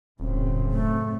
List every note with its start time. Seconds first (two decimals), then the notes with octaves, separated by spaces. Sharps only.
0.20 D#1 F#2 A2 C#3 C4
0.71 A3